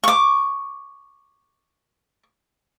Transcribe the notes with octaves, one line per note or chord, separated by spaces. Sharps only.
C#6 D6